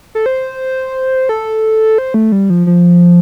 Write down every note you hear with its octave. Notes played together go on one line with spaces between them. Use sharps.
A4
C5
A4
C5
A3
G3
F3
F3